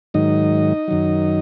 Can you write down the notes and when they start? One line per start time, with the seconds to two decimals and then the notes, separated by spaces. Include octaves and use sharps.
0.14 G#2 D#3 F#3 D#4 D#5
0.88 F#2 D#3 F#3